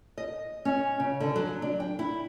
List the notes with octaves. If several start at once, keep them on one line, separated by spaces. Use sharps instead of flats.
D#5
C#4
C#3
D3
F#3
D4
G5
E4